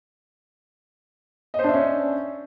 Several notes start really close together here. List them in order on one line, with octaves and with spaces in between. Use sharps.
D#5 C5 D4 E5 C#4